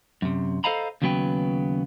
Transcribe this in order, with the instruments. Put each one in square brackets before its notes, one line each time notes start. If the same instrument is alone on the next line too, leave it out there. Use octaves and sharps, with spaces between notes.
[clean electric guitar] F#2 C3
A4 C5 D#5 F5 A#5 B5
D#2 C#3 F#3 B3 B4 G5